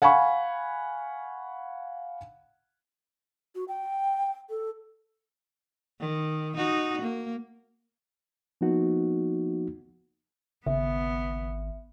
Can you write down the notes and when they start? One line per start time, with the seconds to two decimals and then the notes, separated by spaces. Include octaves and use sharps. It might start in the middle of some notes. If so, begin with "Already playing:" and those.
0.02 F5 F#5 G#5 B5 C#6
3.55 F#4
3.68 G5
4.50 A4
6.00 D#3
6.57 D#4 F#4
7.02 A#3
8.61 F3 A#3 B3 D#4 F#4
10.66 G#1 C#3 B3 E5